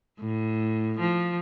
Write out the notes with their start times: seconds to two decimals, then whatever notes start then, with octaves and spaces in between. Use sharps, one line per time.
0.20 A2
1.00 F3